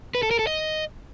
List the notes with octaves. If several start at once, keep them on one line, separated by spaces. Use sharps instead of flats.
B4
A4
A#4
A4
D#5